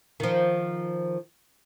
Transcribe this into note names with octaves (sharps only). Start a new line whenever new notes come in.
D#3 F3